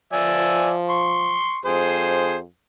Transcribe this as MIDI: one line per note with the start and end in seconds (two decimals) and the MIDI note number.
0.13 1.41 53
0.13 0.73 74
0.13 0.73 76
0.13 0.73 80
0.90 1.57 84
0.90 1.57 85
1.65 2.43 41
1.65 2.35 68
1.65 2.35 72